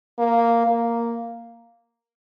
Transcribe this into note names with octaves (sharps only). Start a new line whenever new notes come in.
A#3
A#3